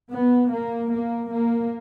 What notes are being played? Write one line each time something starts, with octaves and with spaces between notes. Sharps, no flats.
B3
A#3
A#3
A#3